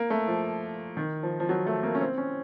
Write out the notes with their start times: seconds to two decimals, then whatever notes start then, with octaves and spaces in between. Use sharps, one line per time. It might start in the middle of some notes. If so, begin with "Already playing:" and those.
Already playing: A#3
0.10 A3
0.28 F3
0.97 D#3
1.23 F3
1.40 F3
1.49 F#3
1.66 A3
1.83 A#3
1.95 C#4
2.01 C4
2.18 C#4